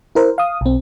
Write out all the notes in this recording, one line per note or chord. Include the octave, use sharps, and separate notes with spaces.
E4 A#4 C5
F5 D#6
B1 C4